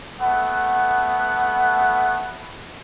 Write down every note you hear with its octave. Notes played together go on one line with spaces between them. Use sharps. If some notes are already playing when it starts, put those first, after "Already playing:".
A3 B3 F#5